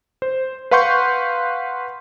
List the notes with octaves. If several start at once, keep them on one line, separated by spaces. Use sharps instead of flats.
C5
B4 F5 F#5 C6 C#6 G6